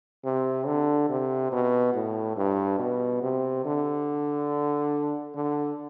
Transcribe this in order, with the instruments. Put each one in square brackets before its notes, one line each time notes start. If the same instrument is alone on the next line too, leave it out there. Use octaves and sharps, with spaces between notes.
[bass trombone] C3
D3
C3
B2
A2
G2
B2
C3
D3
D3